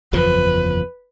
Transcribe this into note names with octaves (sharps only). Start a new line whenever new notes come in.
F#1 E2 F3 B4